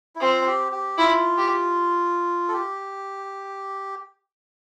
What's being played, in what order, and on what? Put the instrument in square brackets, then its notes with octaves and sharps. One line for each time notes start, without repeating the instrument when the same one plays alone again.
[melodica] E4
[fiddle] C4 [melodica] F4
[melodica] G4
G4
[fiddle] E4 [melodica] F4
[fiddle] G4
[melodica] A4
G4